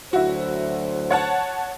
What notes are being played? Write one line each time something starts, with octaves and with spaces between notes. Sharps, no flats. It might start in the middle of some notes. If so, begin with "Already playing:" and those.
D2 F#3 E4 F#4 C5
C#5 F#5 A5